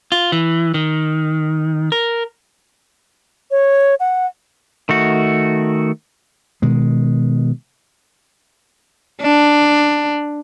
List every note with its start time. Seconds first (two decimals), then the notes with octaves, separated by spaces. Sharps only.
0.12 F4
0.32 E3
0.74 D#3
1.92 A#4
3.51 C#5
4.00 F#5
4.89 D#3 A3 F#4
6.62 B2 D#3 G#3
9.22 D4